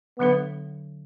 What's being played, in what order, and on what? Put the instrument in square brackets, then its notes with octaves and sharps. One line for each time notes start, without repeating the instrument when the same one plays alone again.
[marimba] D3 F#3 D4 A4 [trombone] B3